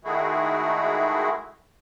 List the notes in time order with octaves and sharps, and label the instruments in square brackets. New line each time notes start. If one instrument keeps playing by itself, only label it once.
[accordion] D#3 G#3 A3 E4 F#4 G#4